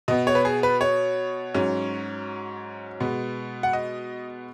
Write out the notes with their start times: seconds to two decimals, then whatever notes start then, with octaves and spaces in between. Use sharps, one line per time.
0.08 B2 B3 D#5
0.27 C#5
0.35 B4
0.45 G#4
0.63 B4
0.81 C#5
1.54 G#2 F#3 C#4
3.00 B2 G#3 B3
3.63 F#5
3.73 D#5